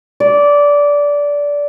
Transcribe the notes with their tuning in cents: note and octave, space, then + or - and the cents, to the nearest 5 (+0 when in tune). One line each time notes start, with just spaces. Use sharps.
D5 -15